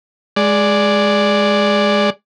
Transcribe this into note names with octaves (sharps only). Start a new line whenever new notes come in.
G#3 D5